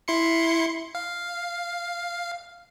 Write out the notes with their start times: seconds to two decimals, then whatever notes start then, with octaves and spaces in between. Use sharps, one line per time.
0.08 E4 C6 C#7
0.95 F5